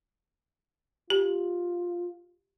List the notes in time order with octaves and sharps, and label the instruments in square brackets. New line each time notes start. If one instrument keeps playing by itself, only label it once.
[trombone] F4 [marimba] G4